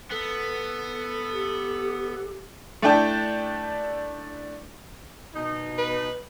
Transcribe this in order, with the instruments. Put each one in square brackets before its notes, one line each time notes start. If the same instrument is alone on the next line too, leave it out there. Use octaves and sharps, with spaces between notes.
[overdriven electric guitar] B3 [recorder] A4
[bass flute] G4
[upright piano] A3 D4 E4 D5 G5 A5
[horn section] B2 D#4
[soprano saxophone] B4